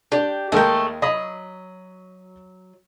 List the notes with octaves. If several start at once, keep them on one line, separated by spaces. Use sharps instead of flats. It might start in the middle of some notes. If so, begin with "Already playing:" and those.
D4 G4
D#2 G#3 A3 A#4 G5
F#3 D#5 B5 D#6